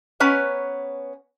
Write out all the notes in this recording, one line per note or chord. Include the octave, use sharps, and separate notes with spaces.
B3 C#4 B4 C#5 A#5